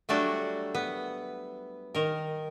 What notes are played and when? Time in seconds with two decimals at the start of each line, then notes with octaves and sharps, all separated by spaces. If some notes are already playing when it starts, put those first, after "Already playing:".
0.09 F#3 G3 A3 D4 F#4
0.75 B3
1.95 D#3 A#4